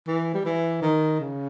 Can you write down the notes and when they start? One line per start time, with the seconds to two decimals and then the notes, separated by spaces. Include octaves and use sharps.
0.07 E3
0.34 G3
0.45 E3
0.82 D#3
1.20 C#3